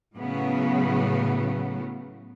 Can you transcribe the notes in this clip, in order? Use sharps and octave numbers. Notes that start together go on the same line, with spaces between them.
A2 C#3 F#3 B3